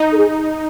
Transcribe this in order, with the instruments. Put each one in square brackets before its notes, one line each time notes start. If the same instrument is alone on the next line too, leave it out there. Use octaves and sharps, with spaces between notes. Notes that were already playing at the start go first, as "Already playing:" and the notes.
Already playing: [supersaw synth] D#4
[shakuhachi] A4
G#4